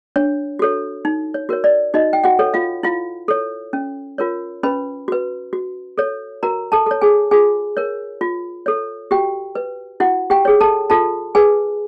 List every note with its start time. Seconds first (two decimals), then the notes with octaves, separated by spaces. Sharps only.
0.16 D4 C#5
0.59 F#4 A4 C#5
1.05 D#4
1.34 C#5
1.49 F#4 A#4 C#5
1.64 D5
1.94 D#4 F#4 D#5
2.13 G5
2.24 F#4 F#5
2.39 A4 C#5
2.54 F4 F5
2.83 E4 F4 F5
3.28 A4 C#5
3.73 C#4
4.18 F4 A#4 C#5
4.63 C#4 B4 B5
5.08 F#4 B4
5.53 F#4
5.98 A4 C#5
6.43 F#4 A#4 A#5
6.72 A4 A5
6.86 A4 C#5
7.01 G#4 G#5
7.31 F4 G#4 G#5
7.77 A#4 C#5
8.21 F4
8.66 A4 C#5
9.11 F#4 G4 G5
9.55 B4
10.00 E4 F#4 F#5
10.30 G4 G5
10.45 G#4 C#5
10.61 A4 A5
10.90 F4 A4 A5
11.35 G#4 B4 G#5